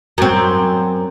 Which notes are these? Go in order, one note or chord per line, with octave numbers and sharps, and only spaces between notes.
F#2 C4